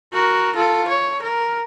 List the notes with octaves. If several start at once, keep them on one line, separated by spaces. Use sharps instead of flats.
F#4 A#4
F4 A4
C#5
A#4